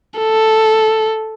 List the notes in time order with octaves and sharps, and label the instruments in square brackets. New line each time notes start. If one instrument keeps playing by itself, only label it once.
[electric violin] A4